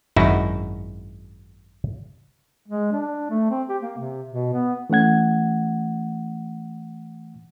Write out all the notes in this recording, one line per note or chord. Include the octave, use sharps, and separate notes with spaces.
G#1 F#2 D#4 E4 F#4
G#3
D4
A3
C4
G4
A#3
C3
B2
B3
E3 A3 C#4 F#5 G#6